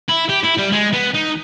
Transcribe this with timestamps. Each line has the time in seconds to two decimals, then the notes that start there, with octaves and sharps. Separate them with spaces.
0.09 E4
0.30 G4
0.44 E4
0.59 G3
0.73 G#3
0.93 B3
1.15 D#4